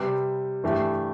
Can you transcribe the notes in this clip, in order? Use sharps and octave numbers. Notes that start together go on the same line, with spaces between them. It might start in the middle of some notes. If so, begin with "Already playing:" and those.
Already playing: C3 G3 C4 G4 B4
G2 E3 A3 E4 G4